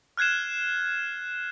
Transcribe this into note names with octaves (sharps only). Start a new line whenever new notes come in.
F6 F#6 G#6 C7 E7